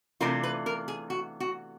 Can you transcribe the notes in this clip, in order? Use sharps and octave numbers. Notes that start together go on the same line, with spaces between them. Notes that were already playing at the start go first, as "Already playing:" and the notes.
C3 E3 A3 D4 F4 A#4
B4
A#4
G#4
F#4
F#4